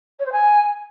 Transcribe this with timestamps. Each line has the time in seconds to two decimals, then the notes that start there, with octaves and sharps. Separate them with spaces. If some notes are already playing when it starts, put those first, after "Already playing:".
0.19 C#5
0.25 C5
0.32 G#5